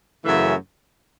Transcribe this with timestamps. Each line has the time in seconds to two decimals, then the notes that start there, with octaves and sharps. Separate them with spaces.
0.24 F#2 C#3 E3 A3 E5